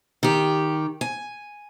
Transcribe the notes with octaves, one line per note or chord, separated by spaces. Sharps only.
D#3 G4
G#5